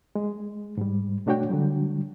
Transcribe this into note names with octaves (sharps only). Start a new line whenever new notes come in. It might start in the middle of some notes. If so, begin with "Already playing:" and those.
G#3
G#2 G3
B2 A3 D4 F#4 C#5 G5
D3 F#3 G3